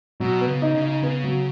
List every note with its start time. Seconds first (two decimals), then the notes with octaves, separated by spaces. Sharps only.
0.20 B2 F#3
0.41 B3
0.48 C#3
0.62 D#4
0.75 C#3
0.82 D#4
1.03 C#3 B3
1.24 F#3